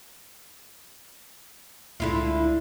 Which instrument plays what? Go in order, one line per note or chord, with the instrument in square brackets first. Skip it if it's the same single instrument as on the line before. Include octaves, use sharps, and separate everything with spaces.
[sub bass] C#2 [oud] D3 E4 F4